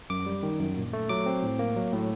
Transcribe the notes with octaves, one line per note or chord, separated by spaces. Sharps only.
F#2 D6
G3
D#3
F#2
A#2
A3
F#3 D6
C4
A2
A#3
F#3
A2